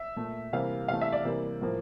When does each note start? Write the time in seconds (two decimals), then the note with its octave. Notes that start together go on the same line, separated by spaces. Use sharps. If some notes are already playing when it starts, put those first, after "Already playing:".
Already playing: E5
0.16 A#2 A3
0.53 C3 E3 G3 A#3 F5
0.88 C3 E3 A3 F5
1.01 E5
1.12 D5
1.25 C3 E3 G3 A#3
1.61 A2 F3 A#3